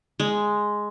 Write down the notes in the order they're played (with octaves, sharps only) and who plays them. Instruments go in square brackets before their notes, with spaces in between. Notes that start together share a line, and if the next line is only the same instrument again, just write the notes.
[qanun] G#3